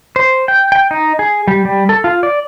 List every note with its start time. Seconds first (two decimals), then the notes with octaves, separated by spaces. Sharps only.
0.16 C5
0.48 G5
0.72 G5
0.91 D#4
1.19 G#4
1.48 G3
1.65 G3
1.89 A4
2.04 F4
2.23 D5